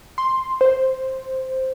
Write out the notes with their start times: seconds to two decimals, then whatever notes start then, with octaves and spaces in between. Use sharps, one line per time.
0.18 C6
0.61 C5